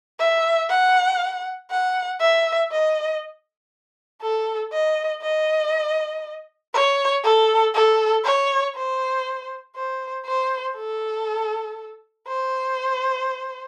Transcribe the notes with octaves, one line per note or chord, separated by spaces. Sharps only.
E5
F#5
F#5
E5
D#5
A4
D#5
D#5
C#5
A4
A4
C#5
C5
C5
C5
A4
C5